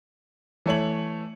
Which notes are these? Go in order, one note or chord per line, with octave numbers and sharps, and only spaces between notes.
E3 A3 C#5 F#7